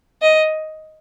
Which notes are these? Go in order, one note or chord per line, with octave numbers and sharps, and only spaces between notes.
D#5